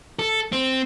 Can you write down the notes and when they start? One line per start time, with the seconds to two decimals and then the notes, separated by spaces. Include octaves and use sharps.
0.19 A4
0.52 C4